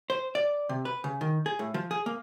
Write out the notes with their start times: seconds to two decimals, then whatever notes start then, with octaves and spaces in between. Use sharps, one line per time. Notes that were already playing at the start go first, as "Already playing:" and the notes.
0.10 C5
0.35 D5
0.69 C3
0.85 B4
1.04 C#3
1.21 D#3
1.46 G#4
1.59 A2
1.74 F3
1.91 G#4
2.06 A#3